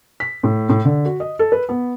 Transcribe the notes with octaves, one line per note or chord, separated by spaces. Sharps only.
B6
A2
A2
D3
F#4
D#5
A4
B4
B3